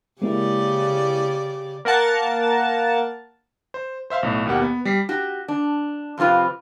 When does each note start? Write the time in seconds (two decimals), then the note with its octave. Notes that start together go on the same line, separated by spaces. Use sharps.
0.22 C#3 G#3 A#3 E4 G4 D5
1.85 A#3 A#4 F#5 A5
3.74 C5
4.10 C5 E5 F5 C6
4.23 B1 A2
4.46 D#2 B2 A#3 G4 F#5
4.62 B3
4.85 G3 B6 C7
5.09 F#4 G4
5.48 D4
6.18 F2 C3 C4 F4 B4